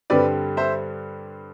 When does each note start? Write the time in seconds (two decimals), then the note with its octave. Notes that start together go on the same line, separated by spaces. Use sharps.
0.10 G2 D3 G3 C4 B4 D5
0.57 C5 E5